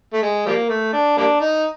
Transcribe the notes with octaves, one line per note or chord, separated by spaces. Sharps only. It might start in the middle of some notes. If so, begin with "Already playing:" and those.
A3
G#3
F3 G3 A#3
A3
D4
G3 A#3 D4
D#4